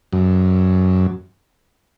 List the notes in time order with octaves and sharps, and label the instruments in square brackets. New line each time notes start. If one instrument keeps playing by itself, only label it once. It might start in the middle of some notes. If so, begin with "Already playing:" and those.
[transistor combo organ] F#2